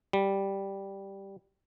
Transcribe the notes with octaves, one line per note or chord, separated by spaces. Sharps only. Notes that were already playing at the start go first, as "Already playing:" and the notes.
G3